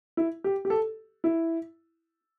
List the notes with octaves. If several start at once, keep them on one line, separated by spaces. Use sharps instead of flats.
E4
G4
G4
A4
E4